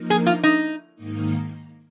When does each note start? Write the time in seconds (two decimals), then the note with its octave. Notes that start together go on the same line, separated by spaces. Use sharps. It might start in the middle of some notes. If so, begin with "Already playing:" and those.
Already playing: F3 A#3 D#4 A#4
0.10 G#4
0.26 F4
0.43 D#4
0.95 G#2 D#3 A#3 D#4